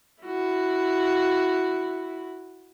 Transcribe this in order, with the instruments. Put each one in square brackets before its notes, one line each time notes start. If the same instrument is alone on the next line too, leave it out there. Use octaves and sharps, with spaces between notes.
[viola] E4 F#4